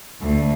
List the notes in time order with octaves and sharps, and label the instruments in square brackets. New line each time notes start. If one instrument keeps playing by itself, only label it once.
[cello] D2